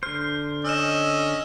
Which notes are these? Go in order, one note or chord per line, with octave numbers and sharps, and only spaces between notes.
D3 C5 F6
C#4 D#5 E6 F6 E7